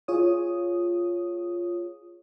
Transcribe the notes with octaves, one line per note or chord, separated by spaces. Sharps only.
F4 G#4 C#5 D#6